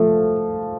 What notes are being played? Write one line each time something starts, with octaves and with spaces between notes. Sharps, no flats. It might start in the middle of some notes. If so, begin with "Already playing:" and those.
Already playing: F3 A3